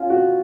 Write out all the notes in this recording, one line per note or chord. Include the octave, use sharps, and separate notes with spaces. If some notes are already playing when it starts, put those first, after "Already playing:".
Already playing: C#4 F4
F#4